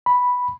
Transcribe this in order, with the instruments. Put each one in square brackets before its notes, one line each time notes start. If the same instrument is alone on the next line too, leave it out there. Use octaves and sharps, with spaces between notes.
[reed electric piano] B5